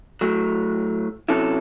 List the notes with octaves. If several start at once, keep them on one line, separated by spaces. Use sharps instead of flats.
A2 F#3 A3
C3 F#3 C#4 E4 A4